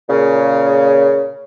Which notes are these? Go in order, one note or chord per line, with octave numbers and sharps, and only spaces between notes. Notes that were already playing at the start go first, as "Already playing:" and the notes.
A#2 C#3